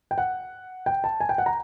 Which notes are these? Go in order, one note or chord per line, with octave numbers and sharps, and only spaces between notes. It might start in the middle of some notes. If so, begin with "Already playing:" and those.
G5
F#5
G5
A5
G#5
G5
F#5
A#5